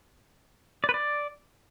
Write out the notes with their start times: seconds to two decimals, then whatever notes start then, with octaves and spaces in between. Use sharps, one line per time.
0.84 D5
0.89 B4
0.94 D5